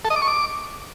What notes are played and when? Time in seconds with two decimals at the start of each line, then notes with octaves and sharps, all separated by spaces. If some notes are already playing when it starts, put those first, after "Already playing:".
0.05 A4
0.10 D#5
0.16 D6
0.22 C#6
0.28 D6